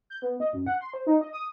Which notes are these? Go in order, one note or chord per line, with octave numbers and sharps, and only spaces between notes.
G6
B3
D#5
F#2
F#5
C6
C5
D#4
D#5
D#6